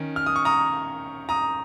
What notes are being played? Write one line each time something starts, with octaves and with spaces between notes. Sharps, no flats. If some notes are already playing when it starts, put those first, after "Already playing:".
Already playing: D#3 C#4
F6
D#6
C#6
A#5 D#6
A#5 D#6